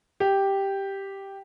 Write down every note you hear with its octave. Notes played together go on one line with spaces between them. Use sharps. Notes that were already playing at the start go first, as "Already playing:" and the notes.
G4